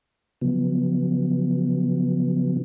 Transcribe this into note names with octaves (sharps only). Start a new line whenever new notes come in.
C#3 F3 F#3 B3